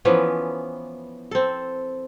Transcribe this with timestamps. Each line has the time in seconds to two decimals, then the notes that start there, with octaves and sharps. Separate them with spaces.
0.05 E3 F3 B3 C#4
1.31 C4 A4